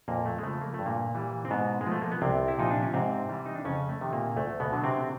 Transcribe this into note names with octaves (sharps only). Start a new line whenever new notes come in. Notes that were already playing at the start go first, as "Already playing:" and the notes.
F2 A#2 A#3
A3
G#3
C#3 F3 A3
A#3
G2 A3
A#2 A#3
E3 G3
C4
G#2 B2 B3
G#3
F3 A3
A#3
B3
C2 C3 C4
E4
A#2 F3 D#4
D4
C#4
G#2 C3 C4
E3 G3
D#4
D4
F2 C#3 C#4
A3
C3 D#3
A#2 A#3
D2 A3
B2 B3
D3 F#3
C3 C4